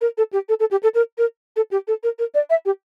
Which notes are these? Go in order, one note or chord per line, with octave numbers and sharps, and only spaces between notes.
A#4
A4
G4
A4
A4
G4
A4
A#4
A#4
A4
G4
A4
A#4
A#4
D5
E5
G4